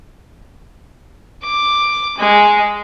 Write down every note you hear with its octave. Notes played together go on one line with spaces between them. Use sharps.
D6
G#3